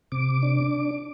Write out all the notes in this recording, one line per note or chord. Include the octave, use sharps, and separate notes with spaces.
C3 D6
D4